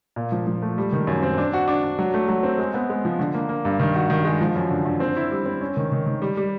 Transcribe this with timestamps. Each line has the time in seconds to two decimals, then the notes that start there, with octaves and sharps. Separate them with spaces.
0.16 A#2
0.32 F3
0.47 F3
0.62 A3
0.78 G3
0.93 D#3
1.07 F#2
1.22 C4
1.38 D4
1.53 F#4
1.68 D4
1.83 D4
1.99 F#3
2.14 A3
2.29 F#3
2.43 C4
2.58 G#3
2.74 B3
2.90 G#3
3.05 F3
3.19 D3
3.34 A#3
3.49 A#3
3.65 G2
3.80 D#3
3.96 F#4
4.10 D#3
4.25 G#3
4.41 F3
4.56 F#2
4.70 D3
4.86 D3
5.00 C4
5.16 E4
5.31 G3
5.46 C4
5.61 C#4
5.77 D#3
5.92 D#3
6.06 D#3
6.22 G3
6.37 G3